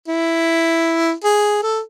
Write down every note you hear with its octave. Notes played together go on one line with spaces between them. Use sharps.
E4
G#4
A4